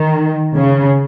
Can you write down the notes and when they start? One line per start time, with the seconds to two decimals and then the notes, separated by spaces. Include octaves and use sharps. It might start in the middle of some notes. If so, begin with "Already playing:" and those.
Already playing: D#3
0.55 C#3